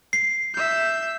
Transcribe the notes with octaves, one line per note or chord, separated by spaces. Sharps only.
C7
E5 G6